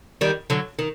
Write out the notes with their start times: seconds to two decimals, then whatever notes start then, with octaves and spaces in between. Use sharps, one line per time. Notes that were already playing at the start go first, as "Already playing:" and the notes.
0.21 D#3 G3
0.50 D3 F#3
0.79 D#3